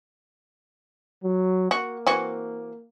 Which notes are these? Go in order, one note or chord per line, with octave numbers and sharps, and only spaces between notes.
F#3
A#3 F#4
E3 C4 F#4